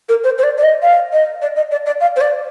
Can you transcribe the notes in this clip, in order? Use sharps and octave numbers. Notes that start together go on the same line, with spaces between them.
A#4
C5
C5
D5
D5
D#5
F5
D#5
D5
D#5
D5
D5
F5
C5
D5